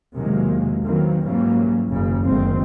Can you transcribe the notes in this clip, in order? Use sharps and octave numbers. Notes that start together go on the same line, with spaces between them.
E2 C3 D#3 F#3 G#3 A#3
D#3 E3 F#3 A#3 C4
G#2 E3 F#3 G3 A#3 C#4
F#1 D#2 C#3
F#1 D2 D#3 G#3 C4